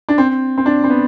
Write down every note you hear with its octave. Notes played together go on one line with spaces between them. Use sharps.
D4
C4
C4
D4
C4
B3